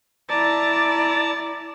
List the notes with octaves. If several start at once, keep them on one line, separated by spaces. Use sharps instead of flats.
E4 D5 A5 A#5